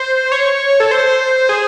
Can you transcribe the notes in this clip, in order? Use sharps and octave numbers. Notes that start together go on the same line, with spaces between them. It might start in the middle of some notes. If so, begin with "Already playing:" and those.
Already playing: C5
C#5
A4
C5
G#4